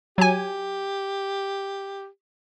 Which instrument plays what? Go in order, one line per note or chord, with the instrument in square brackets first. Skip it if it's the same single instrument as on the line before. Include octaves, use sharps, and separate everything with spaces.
[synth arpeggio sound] F#3 G#5 [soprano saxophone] G4